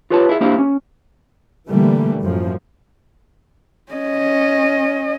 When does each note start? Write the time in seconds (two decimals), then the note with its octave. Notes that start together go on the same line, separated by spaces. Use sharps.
0.10 F4 G4 B4 C#5 F#5 A5
0.29 E4 G#4 E5
0.41 A#3 D4 E4 G4 C5 F5
0.58 C#4
1.69 A#2 D3 E3 G3 A3 A#3
2.20 F#2 A2 F3
3.92 C#4 D#5